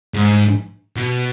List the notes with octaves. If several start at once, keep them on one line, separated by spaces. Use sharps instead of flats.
G#2
B2